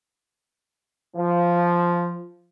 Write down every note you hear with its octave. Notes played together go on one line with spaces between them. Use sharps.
F3